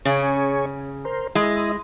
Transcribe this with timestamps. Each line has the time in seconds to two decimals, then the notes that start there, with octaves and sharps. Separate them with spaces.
0.05 C#3 C#4 G#4 C#5
1.05 A#4 C5
1.35 G#3 E4 D#5